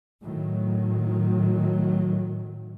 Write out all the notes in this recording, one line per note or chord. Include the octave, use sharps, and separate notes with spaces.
A2 D#3 F#3